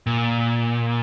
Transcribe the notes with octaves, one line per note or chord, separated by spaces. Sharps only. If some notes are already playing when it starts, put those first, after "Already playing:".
A#2